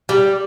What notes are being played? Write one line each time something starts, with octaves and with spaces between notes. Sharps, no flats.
G3